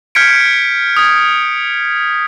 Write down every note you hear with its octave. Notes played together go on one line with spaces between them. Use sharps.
F6 G6 G#6 B6 C#7 D7
D#6 G#6